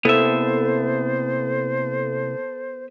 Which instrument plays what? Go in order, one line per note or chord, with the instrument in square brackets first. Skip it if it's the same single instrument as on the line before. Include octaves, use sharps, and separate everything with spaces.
[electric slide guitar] C3 A#3 E4 [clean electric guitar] B3 E5 [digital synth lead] A4 [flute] C5